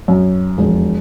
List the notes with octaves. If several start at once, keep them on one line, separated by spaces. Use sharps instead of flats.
F#2
E1 F2